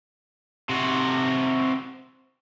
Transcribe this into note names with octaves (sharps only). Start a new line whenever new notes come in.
C3 F#4